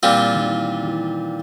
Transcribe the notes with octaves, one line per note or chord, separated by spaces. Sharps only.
A#2 E3 G3 C4 F4
D#3
E3
D#3
E3